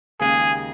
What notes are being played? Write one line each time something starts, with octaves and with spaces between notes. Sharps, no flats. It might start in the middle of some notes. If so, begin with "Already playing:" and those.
D#2 C#3 G#3 G#4